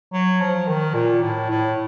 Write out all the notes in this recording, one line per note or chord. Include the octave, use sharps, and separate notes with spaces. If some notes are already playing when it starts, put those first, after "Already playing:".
F#3
F3
D#3
A#2
A2
A2